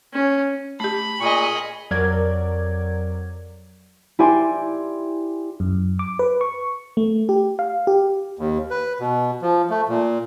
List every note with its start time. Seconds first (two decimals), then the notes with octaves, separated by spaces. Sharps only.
0.13 C#4
0.80 A3 G4 B5
1.20 A#2 G#4 D#5 C#6
1.91 F2 F#3 A#4 D5 G#6
4.19 E4 G4 D5 G#5 C6
5.60 F#2
5.99 D6
6.19 B4
6.41 C#6
6.97 A3
7.29 G4
7.59 F5
7.87 G4
8.39 D#2
8.71 B4
9.00 B2
9.42 F3
9.70 A3
9.88 A#2